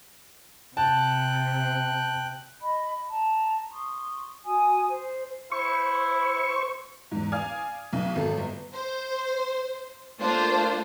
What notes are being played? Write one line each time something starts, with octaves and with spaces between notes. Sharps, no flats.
C3 G5 A5 F#6
D#5 B5
A5 A#5
C6 C#6 D#6
F#4 G#5 D#6
C5
E4 C5 C#6
E2 G#2
D5 F5 G#5 D#6 F6 G#6
B1 B2
G#1 A4
G1
C5
A3 A#3 D4 F4 C5